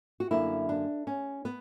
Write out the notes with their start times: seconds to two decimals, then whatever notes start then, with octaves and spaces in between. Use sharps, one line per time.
0.20 F#4
0.31 F#2 D3 A#3 E4
0.69 D4
1.07 C#4
1.45 B3